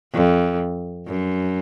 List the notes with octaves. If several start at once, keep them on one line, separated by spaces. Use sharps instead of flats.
F2
F#2